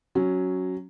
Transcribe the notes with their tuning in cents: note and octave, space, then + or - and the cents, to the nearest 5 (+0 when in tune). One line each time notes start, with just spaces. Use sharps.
F#3 +0 C#4 +0